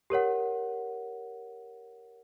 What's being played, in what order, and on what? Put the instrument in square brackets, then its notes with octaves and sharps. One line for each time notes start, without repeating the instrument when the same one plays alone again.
[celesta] G4 A#4 C#5 F#5